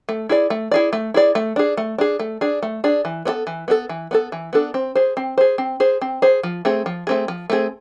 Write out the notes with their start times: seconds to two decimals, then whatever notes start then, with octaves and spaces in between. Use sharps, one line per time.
0.09 A3
0.29 E4 G#4 D5
0.50 A3
0.71 E4 G#4 D5
0.93 A3
1.14 E4 G#4 D5
1.35 A3
1.56 D4 G#4
1.77 A3
1.98 D4 G#4
2.20 A3
2.41 D4 G#4
2.63 A3
2.84 D4 G#4
3.05 E3
3.25 B3 D4 A4
3.47 E3
3.68 B3 D4 A4
3.89 E3
4.11 B3 D4 A4
4.32 E3
4.53 B3 D4 A4
4.74 C4
4.95 G#4 C5
5.17 C4
5.38 G#4 C5
5.58 C4
5.80 G#4 C5
6.01 C4
6.22 G#4 C5
6.43 F3
6.65 A3 C4 G#4
6.86 F3
7.07 A3 C4 G#4
7.28 F3
7.50 A3 C4 G#4